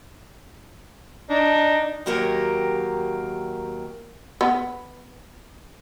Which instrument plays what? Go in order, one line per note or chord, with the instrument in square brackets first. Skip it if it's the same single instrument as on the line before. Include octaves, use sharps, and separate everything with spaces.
[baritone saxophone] D4 [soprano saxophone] D#4
[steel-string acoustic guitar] D#2 F#3 A#3 G4 A#4
[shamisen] B3